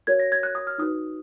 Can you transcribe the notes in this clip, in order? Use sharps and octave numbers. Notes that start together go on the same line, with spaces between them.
F#4 A#4 C#5 G#6
A#6
G#6
F#6
D#6
F6
D#4 F#4 B4 D#6